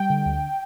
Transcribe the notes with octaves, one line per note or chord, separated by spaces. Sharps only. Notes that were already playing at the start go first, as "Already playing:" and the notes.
Already playing: G3 G5
D3
D2